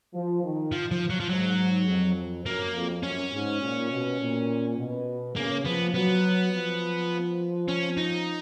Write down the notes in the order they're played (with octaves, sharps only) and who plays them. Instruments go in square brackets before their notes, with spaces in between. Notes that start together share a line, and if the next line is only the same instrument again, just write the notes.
[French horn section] F3
D#3
[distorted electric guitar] F3
F3
F#3
F3
[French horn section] G#2 [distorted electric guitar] F#3
[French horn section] F2
[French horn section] F#2 [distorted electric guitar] A#3
[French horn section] F2
[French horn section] F#2 [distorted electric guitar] C#4
[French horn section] G#2
A#2
B2
A#2
B2
[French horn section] C#3 [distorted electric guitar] A#3
[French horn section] F3 [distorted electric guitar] B3
[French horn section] F#3 [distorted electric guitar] B3
[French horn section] F3
[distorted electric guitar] C#4
D#4